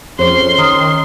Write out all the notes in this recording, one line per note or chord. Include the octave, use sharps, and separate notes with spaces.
F2 C#4 G#4 C5 C#5 C6
D#3 A#5 D#6 F6